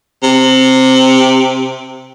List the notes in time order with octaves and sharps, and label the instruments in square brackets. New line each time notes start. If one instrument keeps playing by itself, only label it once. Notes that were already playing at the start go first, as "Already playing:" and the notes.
[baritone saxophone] C3